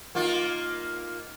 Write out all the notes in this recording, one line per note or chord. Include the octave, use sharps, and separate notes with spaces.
A#3 D#4 F4